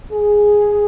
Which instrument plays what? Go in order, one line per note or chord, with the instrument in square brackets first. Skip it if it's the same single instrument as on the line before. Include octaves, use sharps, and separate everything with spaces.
[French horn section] G#4